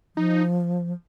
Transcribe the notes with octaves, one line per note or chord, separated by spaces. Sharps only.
F3 D#4